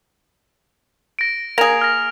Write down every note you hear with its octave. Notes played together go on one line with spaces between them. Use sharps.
A#6 D7
A#3 G#4 A#6 F7
F6 A#6